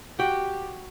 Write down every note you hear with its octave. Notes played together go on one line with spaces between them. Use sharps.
F#4 G4 G5